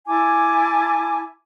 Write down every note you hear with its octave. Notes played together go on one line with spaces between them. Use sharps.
E4 G#5 A5 D6